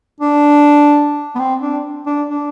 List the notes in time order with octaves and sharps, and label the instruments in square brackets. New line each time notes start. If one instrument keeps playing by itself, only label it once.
[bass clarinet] D4
B3
C4
D4
D4
D4